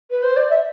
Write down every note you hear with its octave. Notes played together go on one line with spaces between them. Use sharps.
B4
C5
D5
E5